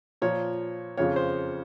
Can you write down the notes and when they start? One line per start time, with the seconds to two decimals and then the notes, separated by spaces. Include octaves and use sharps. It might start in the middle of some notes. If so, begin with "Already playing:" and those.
0.22 A#2 F3 C#5
0.97 F2 C#3 F3 C#5
1.16 C5